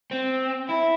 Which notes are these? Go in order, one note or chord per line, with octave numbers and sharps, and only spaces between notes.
C4
E4